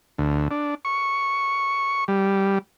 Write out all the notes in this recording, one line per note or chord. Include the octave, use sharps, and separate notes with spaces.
D2
D4
C#6
G3